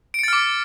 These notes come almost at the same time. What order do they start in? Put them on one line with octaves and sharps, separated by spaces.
D7 C#7 A6 F6 D6